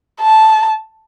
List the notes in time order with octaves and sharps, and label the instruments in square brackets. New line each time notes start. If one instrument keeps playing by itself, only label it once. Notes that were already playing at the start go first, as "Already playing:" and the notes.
[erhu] A5